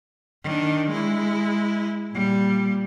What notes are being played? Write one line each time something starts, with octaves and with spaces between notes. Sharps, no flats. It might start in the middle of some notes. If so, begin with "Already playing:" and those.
D#3 D4
G#3 E4
A#2 G3